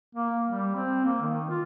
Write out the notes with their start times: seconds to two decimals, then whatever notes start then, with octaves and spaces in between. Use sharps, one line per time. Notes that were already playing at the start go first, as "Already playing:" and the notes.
0.15 A#3
0.47 G3
0.75 C4
1.05 A#3
1.21 D#3
1.50 F4